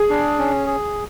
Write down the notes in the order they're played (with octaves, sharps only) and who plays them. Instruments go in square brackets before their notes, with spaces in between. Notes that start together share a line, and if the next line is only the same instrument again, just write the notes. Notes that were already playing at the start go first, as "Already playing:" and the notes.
Already playing: [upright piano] G#4
[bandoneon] D4
C#4
G#4